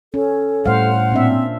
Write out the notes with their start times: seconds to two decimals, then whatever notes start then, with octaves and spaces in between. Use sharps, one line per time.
0.14 C#4 A4
0.66 A2 G3 C5 F5 F#5
1.12 A#2 C4 D4 E5